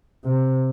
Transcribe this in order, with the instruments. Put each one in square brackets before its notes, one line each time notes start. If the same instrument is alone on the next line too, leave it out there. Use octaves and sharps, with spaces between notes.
[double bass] C3